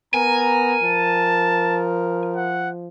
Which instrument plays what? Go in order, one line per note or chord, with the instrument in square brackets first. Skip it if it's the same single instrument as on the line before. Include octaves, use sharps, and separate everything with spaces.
[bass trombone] B3 [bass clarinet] A#4 [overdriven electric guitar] G#5 [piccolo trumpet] A#5
[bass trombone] F3 [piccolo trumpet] A5
[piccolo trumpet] F#5